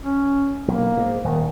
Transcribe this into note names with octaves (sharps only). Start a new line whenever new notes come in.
C#4
B1 A#3
G#2
D#1 D#3